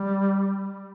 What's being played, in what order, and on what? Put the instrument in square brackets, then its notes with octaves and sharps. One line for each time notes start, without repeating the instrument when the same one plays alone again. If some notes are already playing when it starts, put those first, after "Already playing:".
Already playing: [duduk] G3